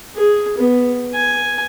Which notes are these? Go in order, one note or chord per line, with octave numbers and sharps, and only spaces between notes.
G#4
B3
G#5